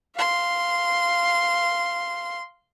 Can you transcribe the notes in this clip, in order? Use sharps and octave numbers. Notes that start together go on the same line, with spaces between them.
F5 C6